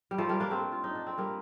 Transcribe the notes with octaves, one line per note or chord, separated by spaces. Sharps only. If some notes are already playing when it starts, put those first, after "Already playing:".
G3
F3 A3
G3 A#3
A#3 D4
A3 C4
F4
D#4
D4
C4
G3 A#3